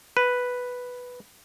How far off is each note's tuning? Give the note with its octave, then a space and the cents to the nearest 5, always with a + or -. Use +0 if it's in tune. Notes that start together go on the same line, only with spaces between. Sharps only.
B4 +0